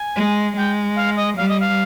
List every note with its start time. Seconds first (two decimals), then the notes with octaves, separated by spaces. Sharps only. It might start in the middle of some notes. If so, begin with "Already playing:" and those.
Already playing: G#5
0.16 G#3
0.56 G#3 G5
0.96 F5
1.16 D#5
1.37 G3 F5
1.49 D#5
1.60 F5